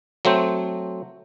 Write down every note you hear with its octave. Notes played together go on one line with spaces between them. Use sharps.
F#3 A3 C4 C5